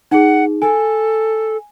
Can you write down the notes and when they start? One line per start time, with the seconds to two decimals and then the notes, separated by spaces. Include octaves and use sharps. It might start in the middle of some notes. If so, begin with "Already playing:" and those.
0.11 D#4 G#4 F#5
0.62 A4 G#5